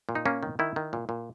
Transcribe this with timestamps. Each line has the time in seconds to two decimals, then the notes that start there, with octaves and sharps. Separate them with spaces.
0.09 A#2
0.15 D#4
0.26 A#3 C#4
0.43 D#3
0.59 D#3 E4
0.76 D#3
0.93 A#2
1.09 A#2